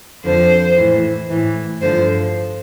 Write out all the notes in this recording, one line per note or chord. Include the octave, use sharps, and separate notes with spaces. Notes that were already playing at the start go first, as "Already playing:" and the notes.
F2 D3 F3 C5
A2 E3
A2 E3
G2 D3 F3 C5